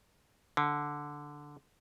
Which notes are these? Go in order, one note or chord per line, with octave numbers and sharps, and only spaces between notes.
D3